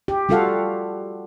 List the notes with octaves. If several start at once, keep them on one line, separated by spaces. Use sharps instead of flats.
G4
G3 F4 F#4 A4 F5 F#5